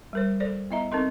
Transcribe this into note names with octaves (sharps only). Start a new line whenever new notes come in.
G3 A#4 C5
A4 C5 D5
B3 E4 D#5 E5 A#5
C4 D#4 A4 A#4 D#5 C6